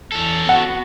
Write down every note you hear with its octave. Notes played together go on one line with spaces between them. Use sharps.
E2 C#4 A4
B3 F#4 F#5